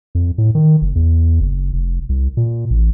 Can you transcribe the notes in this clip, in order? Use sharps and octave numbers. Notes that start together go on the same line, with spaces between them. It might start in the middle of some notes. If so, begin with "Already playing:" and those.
F2
A2
D#3
F#1
E2
F#1
F1
C2
A#2
A1